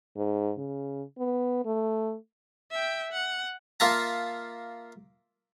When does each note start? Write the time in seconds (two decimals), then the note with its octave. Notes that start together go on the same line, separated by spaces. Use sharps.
0.16 G#2
0.58 C#3
1.18 B3
1.65 A3
2.71 E5 G5
3.13 F#5
3.80 A#3 F4 E5 A5 A#5